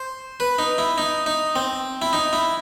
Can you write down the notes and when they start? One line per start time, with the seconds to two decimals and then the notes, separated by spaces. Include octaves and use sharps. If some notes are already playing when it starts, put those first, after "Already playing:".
Already playing: C5
0.40 B4
0.59 D#4
0.78 E4
0.98 D#4
1.26 D#4
1.56 C4
2.02 E4
2.13 D#4
2.33 E4